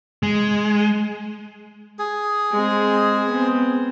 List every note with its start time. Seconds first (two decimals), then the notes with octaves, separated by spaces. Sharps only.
0.23 G#3
1.99 G#4
2.51 G#3 C4
3.28 B3 C4